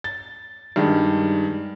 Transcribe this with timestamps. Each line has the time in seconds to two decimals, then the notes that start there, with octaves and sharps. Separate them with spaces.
0.04 A6
0.76 G2 D#3 G#3